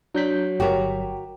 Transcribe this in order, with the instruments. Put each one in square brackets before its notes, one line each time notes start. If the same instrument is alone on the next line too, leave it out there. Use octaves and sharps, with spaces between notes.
[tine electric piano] F#3 B6 [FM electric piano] D4 G6
[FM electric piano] G1 [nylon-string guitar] F#4 A#4 [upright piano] G4 C#5